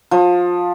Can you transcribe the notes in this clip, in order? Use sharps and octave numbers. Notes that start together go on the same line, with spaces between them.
F3